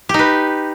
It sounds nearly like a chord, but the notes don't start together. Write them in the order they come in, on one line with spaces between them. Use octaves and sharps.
G4 D#4 B4